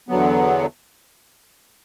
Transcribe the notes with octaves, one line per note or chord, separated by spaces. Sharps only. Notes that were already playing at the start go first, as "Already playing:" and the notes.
E2 D3 F#3 B3